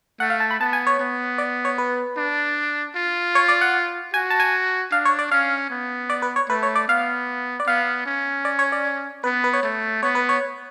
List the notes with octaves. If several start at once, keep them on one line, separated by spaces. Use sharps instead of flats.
A3 F#5
F5
A5
B5
B3 A5
G#5
C#5
B3
D5
C#5
B4
D4
F4
C#5
D5
F#5
F#4 G#5
A5
G#5
D4 F5
C#5
D5
C#4 F5
B3
D5
B4
C#5
A3 B4
C#5
D5
B3 F5
D5
B3 F5
C#4
D5
C#5
D5
B3 B4
B4
C#5
A3
B3 C#5
B4
C#5